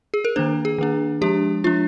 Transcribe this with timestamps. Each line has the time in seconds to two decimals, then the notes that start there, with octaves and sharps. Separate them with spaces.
0.14 G#4
0.25 A#4
0.36 D#3 A#3 D4 C5
0.65 G#4
0.78 D#3 A#3 D4
1.21 F3 G#3 D4 G4
1.64 F3 G#3 D4 F4